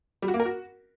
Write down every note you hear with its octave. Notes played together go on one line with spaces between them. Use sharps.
G3
F#4
A#3
A#4
F#4